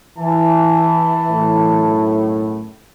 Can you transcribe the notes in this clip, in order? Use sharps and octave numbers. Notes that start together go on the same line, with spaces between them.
E3 E4 G#5 A5
B1 F#2 A2